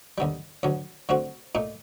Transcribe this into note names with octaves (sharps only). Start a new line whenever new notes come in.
D#2 D3 G3
D2 D3 F#3
D3 A3 C4 F#4
A#2 A3 D#4